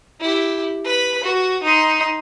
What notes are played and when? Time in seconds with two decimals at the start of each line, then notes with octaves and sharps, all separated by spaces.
0.20 E4 G4
0.84 B4 B5
1.24 F#4
1.63 D#4 C6